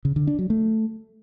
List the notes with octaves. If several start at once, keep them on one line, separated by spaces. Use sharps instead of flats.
C#3
D3
D4
F#3
A3